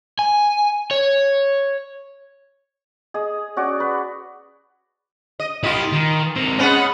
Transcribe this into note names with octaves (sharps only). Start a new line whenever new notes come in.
G#5
C#5
G#4 D#5
C#4 F#4 D5
B4
D#5
E4 F4 G4 D#5
D#3
C4 A#4
G#3 B3 C#4 D#5 F#5